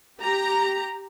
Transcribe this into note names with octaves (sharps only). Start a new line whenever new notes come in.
G4 A#5